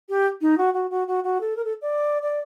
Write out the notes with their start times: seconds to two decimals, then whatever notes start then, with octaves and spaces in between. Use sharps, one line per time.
0.09 G4
0.41 D#4
0.58 F#4
0.74 F#4
0.91 F#4
1.08 F#4
1.24 F#4
1.41 A4
1.57 A#4
1.64 A4
1.82 D5
2.22 D5